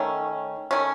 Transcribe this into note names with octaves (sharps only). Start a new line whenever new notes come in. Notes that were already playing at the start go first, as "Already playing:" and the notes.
Already playing: D#3 A3 C#4
D#3 A3 C#4